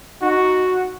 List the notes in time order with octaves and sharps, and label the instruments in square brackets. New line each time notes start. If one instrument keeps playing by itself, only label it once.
[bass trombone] D#4 [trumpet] F#4